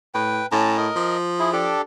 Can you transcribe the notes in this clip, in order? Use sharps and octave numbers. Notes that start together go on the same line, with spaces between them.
A2 B4 G5
A2 C#4 A5 A#5
A#4 D#5
F3
E4 G#4
D4 G4 A4